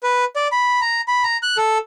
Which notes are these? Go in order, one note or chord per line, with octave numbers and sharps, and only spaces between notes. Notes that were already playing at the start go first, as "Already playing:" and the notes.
B4
D5
B5
A#5
B5
A#5
F#6
A4